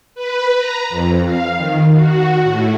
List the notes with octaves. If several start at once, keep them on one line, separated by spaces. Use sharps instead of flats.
B4
A#5
F2
F5
D#3
F#4
A2